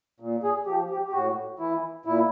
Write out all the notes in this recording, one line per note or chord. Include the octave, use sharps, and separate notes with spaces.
A#2
G#4
F3 G4
G4
G4
A2 F#4
E3 E4
A#2 E4